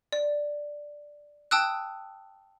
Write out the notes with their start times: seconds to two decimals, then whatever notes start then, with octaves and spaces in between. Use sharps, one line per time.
0.12 D5
1.51 G5 A5 D#6 E6 F#6